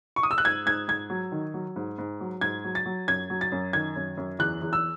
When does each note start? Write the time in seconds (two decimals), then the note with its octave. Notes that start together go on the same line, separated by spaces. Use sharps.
0.16 C#6
0.23 D#6
0.31 E6
0.38 F#6
0.45 G#2 G#6
0.66 G#2 G#6
0.88 G#2 G#6
1.10 F#3
1.32 D#3
1.54 F#3
1.76 G#2
1.98 G#2
2.21 F#3
2.41 G#2 G#6
2.64 F#3
2.75 A6
2.86 F#3
3.08 F#2 G#6
3.30 F#3
3.41 A6
3.52 F#2
3.73 D#3 G#6
3.96 F#2
4.17 F#2
4.39 E2 F#6
4.62 E2
4.73 E6